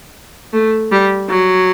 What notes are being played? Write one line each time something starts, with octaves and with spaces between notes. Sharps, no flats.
A3
G3
F#3